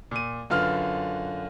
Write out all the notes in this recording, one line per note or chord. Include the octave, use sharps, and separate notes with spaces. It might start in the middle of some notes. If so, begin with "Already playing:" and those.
A#2 D#7
F#2 D3 F4 B4 F6